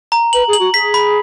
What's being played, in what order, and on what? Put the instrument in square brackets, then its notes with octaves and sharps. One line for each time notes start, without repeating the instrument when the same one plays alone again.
[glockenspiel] A#5
[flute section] B4 [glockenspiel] F#7
[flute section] G#4
[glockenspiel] F#7
[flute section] F#4
[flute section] G#4 [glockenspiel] B6
[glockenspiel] B5